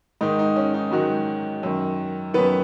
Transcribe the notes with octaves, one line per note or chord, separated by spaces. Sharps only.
G#2 D#3 D#4
D#4
C#4
D#4
G#2 D#3 F#3 F#4
F#2 D#3
F#2 D#3 B3 B4